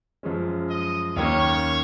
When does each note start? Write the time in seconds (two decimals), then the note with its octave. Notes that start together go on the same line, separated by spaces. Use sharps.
0.23 F#2 F3 G#3 C#4
0.69 D#5
1.17 D#2 D#3 A#3 C#4 C#5